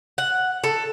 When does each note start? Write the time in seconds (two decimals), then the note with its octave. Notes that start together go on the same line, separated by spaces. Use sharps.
0.18 F#5
0.64 A4